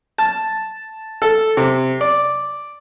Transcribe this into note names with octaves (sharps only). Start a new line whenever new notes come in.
A5
A4
C3
D5